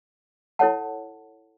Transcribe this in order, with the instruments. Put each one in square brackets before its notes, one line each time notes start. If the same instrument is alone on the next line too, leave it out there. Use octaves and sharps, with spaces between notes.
[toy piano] E4 A4 C#5 F#5 A5